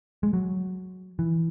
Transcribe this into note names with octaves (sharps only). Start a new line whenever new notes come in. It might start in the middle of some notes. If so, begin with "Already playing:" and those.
G#3
F#3
E3